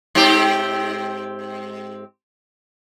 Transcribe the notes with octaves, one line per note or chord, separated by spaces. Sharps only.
G#2 C4 G4